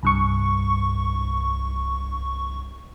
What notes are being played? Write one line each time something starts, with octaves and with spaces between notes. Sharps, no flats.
C2 G2 C#6